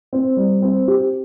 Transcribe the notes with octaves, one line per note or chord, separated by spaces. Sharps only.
C4
G3
C4
G4